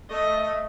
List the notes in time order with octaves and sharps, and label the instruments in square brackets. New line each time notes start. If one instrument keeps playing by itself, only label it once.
[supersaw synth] A3 [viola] D#5